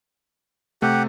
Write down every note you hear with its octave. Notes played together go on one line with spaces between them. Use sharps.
C3 A3 G4 F#5